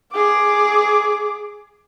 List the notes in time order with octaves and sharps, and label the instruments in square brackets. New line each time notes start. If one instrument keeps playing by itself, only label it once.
[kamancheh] G#4 D6